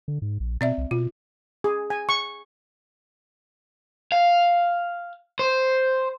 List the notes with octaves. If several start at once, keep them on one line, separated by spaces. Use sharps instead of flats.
D3
G#2
A#1
B2 C4 D5 E5
C2
B2 F4
G#4
G#5
C#6
F5
C5